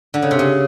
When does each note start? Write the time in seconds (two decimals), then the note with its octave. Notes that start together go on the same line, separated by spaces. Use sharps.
0.14 D3
0.22 C#3
0.31 C3
0.39 C#3